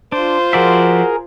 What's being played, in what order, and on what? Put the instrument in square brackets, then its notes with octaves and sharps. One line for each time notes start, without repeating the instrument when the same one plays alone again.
[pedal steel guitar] D4 [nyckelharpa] F4 C5
[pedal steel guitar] F3 D5 E5 [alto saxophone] F#4 [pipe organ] G#4 A#4